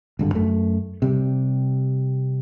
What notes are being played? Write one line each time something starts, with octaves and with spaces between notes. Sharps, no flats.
G#1 G2 D3
F#2 A3
C3 G3